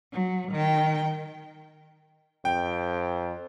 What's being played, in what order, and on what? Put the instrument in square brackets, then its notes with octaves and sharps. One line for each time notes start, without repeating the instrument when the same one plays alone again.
[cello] F#3
D#3 G5
[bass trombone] F2 [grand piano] G5